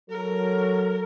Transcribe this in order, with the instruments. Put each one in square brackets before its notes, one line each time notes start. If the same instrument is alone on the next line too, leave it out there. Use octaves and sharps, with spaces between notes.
[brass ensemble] F#3 [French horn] A4 [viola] A#4